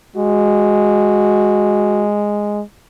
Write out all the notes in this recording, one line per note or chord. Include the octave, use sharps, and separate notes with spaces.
G#3 F#4